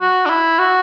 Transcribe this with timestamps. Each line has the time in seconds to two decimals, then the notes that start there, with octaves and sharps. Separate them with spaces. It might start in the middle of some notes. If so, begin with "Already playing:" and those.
0.01 F#4
0.26 D4
0.30 E4
0.59 F#4